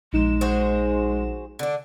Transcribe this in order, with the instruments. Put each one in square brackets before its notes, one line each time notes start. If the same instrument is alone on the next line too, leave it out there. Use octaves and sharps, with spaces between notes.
[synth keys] A#1 D#4 E7 [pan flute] G#3
[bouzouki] F#4 G#4 C5
D3 D4